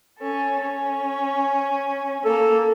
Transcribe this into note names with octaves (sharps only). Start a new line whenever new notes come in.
C#4 A4
C#4
A#3 A4